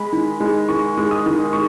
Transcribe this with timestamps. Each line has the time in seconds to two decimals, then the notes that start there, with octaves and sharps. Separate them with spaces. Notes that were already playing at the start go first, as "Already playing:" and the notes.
Already playing: G#3 B5
0.13 D#3
0.40 G#3
0.69 D#3 C#6
0.98 G#3
1.11 D#6
1.26 D#3
1.53 G#3 C#6